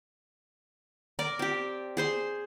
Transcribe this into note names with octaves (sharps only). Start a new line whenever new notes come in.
A#4 D5
C4 G4
G#4 C5 C6